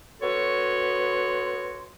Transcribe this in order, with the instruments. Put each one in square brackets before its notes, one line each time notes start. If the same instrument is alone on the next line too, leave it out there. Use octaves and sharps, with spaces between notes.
[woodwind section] B3 F#4 A4 C#5 C6